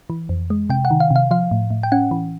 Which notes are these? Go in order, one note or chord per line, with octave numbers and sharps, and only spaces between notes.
E3
F2
G#3
C3 G5
F#5
D#3
F5
C3
F5
F3 F5
A2
A2
G5
C#4 F#5
E3